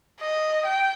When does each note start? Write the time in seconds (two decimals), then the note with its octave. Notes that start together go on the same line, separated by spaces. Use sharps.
0.21 D#5
0.65 G5